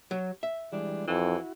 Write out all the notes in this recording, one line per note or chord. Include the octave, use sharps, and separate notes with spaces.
F#3
E5
E3 G3 G#3 D4
F2 E3 E4 F#4